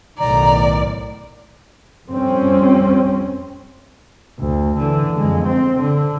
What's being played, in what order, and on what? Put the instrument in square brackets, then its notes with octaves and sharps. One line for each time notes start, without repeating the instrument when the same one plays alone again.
[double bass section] B1 A2 D#3 [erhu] D5 [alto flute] A#5
[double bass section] F2 G3 C4 C#4
[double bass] D2
D3 E3
F2 G#3
C4
D3